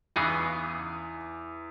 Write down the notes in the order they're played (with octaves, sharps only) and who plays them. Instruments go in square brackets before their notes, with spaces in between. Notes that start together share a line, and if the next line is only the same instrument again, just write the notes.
[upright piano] E2 [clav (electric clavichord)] C#3 E3 B3 D#4 G#4